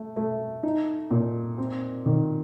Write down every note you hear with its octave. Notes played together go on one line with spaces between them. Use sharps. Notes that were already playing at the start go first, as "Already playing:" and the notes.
Already playing: A3
A3
D#4
A#2
C4
D#3